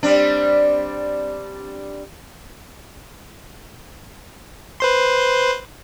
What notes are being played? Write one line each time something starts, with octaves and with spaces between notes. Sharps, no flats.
G3 C4 D4
B4 C5 C6